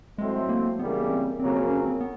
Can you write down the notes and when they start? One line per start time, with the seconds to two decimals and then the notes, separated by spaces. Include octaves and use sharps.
0.18 A2 F#3 G#3 A3 C4
0.49 A#3
0.78 C#2 C#3 E3 G3 A#3 B3
1.10 C4
1.40 F2 C#3 F#3 A#3 C4
1.69 C#4
1.85 C4
2.00 B3